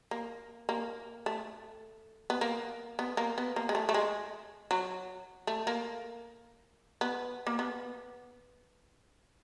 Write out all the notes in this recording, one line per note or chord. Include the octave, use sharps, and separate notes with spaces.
A#3
A#3
A3
B3
A#3
B3
A#3
B3
A#3
G#3
A3
A3
G#3
F#3
A3
A#3
B3
A#3
B3